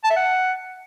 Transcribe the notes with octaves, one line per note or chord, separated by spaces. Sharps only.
A5
E5
F#5